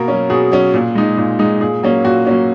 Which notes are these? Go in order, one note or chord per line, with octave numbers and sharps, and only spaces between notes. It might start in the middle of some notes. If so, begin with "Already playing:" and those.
Already playing: B2 A#3 A#4
F#3 C#4
B2 G#4
F#3 C#4
A#2
G#3 D#4
A#2
G#3 D#4
A#2 G#4
F#3 A#3 C#4
A#2 F#4
F#3 A#3 C#4